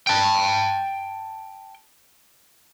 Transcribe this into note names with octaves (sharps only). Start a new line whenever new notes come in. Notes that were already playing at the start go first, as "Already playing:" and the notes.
G5 A5